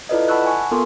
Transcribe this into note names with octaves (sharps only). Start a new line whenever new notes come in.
E4 F4 A4 B4 D5 D#5
F#5 A5 B5 C#6 E6 F#6
G#5 C#6
B3 F4 A4 A#4 C6 C#6